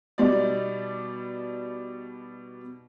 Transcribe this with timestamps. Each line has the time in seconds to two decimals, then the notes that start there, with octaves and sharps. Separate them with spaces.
0.18 B2 G3 D#4 D5